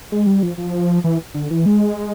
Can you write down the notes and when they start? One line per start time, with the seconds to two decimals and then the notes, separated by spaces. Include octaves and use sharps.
0.12 G#3
0.27 G3
0.43 F3
0.58 F3
1.04 E3
1.34 D3
1.51 E3
1.66 G#3